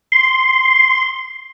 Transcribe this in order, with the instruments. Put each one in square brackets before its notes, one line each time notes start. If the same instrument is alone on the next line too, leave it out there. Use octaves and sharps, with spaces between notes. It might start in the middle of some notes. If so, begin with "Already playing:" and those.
[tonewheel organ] C6